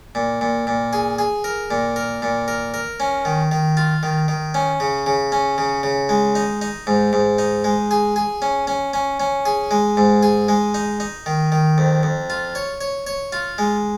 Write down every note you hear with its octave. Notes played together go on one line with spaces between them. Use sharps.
A#2
A#2
A#2
G#4
G#4
A#4
A#2
A#4
A#2
A#4
A#4
C#4
D#3
D#3
F4
D#3
D#3
C#4
C#3
C#3
C#4
C#3
C#3
G#3
D#4
D#4
G#2
G#2
D#4
G#3
G#4
G#4
C#4
C#4
C#4
C#4
G#4
G#3
G#2
G#4
G#3
D#4
D#4
D#3
D#3
F2
F2
F4
C#5
C#5
C#5
F4
G#3